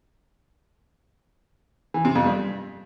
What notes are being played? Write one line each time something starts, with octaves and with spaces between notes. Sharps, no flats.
E3
C3
F2
G2